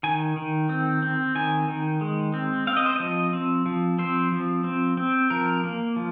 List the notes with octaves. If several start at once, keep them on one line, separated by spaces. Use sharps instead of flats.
D#3 G#5
D#3
C4
C4
D#3 G#5
D#3
G#3
C4
C4 F5
D#5
C5
F3 D#5
C4
F3
C4 C5
F3
C4
C4
F3 A#4
A#3
F3